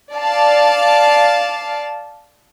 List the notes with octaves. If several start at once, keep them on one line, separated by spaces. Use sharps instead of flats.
D5 F5 A5